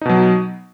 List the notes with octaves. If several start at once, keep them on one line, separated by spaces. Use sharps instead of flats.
B2 F#3 D#4